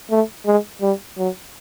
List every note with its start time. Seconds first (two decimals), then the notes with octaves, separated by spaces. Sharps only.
0.11 A3
0.46 G#3
0.81 G3
1.18 F#3